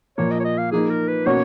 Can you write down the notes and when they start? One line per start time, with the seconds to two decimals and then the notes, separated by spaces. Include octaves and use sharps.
0.18 A#2 F3 A#3 F4 C#5
0.31 D#5
0.40 C#5
0.44 D#5
0.58 F5
0.71 F3 A#3 D#4 G#4
0.90 A#4
1.08 B4
1.26 B2 A#3 C#4 F#4 C#5